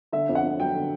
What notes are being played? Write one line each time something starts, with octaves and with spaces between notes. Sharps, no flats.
D3 E5
F2
F#5
F2
F#3 G5
D3